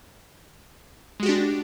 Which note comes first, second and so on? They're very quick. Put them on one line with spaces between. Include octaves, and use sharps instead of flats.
G#3 F#4 G4 D4